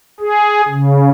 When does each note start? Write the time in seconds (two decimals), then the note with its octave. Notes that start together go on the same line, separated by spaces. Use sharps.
0.20 G#4
0.68 C#3